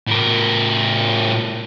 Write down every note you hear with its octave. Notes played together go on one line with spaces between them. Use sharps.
A2 A#4